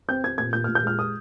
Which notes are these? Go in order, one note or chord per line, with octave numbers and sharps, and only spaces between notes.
C4 G6
C4 G#6
A#2 G#6
A#2 G6
A#2 F6
G6
G#3 F6
D#6